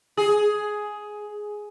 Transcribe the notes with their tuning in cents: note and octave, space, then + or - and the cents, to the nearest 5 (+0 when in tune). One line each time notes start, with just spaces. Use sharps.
G#4 +10